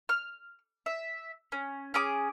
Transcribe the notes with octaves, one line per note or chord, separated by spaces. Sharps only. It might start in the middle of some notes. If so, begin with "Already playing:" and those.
F6
E5
C#4
C#4 G#4 D6